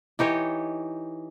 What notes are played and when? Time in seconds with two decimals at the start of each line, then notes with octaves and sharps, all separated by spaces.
0.19 E3 D#4 G4 C#5